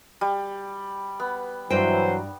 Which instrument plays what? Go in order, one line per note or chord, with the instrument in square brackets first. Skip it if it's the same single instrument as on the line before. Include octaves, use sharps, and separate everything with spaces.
[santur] G3
B3
[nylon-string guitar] G2 G5 [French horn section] E3 F#3 [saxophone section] C5